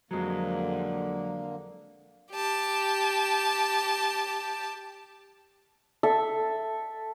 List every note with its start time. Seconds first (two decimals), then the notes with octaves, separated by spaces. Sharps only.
0.11 F2 D3 F#3 G#3 A#3
2.32 G4 A5
6.03 A4 E5